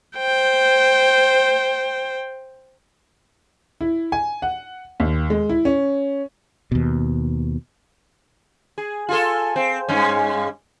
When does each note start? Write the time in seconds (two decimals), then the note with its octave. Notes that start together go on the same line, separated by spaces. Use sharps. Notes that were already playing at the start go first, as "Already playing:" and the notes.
0.18 C5 G5
3.81 E4
4.12 G#5
4.42 F#5
5.00 D#2
5.30 G#3
5.49 E4
5.65 C#4
6.72 D#2 B2
8.78 G#4
9.09 F4 G#4 A4
9.56 C4
9.89 G2 G#3 C#4